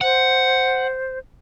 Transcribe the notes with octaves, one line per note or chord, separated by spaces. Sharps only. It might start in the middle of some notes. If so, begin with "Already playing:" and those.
C5 F#5